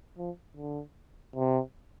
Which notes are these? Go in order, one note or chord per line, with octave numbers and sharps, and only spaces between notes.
F3
D3
C3